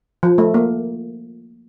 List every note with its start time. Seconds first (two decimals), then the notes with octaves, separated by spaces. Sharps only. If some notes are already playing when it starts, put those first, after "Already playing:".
0.23 F3
0.38 A3
0.54 A#3